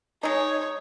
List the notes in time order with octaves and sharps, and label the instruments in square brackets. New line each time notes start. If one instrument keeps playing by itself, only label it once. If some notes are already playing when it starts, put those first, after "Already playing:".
[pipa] G#3 D#4 [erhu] C#5